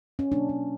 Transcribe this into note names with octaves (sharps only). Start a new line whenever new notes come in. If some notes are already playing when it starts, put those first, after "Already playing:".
C#4
B2 F#3 A#3 D4
D4